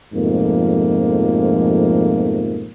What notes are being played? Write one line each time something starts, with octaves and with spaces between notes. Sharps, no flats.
F2 G#2 B2 F3 A3 A#3